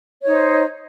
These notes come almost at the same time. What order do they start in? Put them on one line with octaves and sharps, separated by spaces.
C#5 D#4 C5